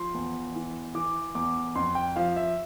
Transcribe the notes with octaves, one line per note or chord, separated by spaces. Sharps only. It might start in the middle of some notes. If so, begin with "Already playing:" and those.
Already playing: F3 C6
E2
E3
E3 D6
E2 D6
F2 C6
G5
F3 F5
E5